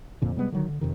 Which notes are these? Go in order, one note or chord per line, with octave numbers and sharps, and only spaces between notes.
F2 A#2 D3
C3 G3 G#3 B3
D3 D#3 F#3
D3
F2 C3 D#3